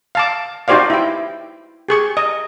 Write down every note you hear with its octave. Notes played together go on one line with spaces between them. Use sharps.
F5 A5 D6
D#4 F#4 G4 C5 D5 F5
E4 G5
G4 G#4 C#6
D#5